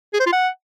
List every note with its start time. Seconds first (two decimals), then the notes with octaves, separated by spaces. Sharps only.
0.13 G#4
0.20 C5
0.26 F4
0.33 F#5